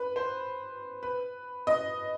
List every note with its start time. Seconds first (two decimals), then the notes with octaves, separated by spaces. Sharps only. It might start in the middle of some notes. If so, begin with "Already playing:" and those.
Already playing: B4
0.16 C5
1.03 B4
1.67 D#5